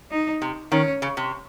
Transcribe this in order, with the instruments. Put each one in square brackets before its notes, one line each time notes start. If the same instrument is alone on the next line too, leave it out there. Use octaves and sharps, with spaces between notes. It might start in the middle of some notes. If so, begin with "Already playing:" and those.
[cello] D#4
[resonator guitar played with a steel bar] C3
[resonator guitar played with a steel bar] D#3 [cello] C#4
[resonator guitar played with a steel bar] C#3
C3